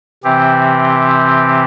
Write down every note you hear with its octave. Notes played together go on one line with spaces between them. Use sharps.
C3 E3 C4 G4